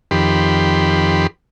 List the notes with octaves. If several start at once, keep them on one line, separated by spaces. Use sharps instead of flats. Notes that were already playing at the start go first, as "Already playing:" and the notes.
F2 D#3 G4 B5 C6